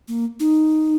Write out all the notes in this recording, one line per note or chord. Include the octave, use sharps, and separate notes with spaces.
A#3
D#4